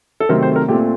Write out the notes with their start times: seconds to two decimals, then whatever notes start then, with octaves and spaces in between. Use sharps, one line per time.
0.20 A4
0.29 C3 D#3 F#3 A3 C4 A#4
0.43 C5
0.56 A#4
0.68 A#2 A3 C4 G4